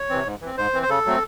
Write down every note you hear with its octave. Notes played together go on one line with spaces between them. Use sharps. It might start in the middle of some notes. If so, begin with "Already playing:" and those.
Already playing: C#5
C3 E3 C4
G#2
E3 C4
G#2 C5
E3 C4
C5
C#3 A4
F#3 A3 C4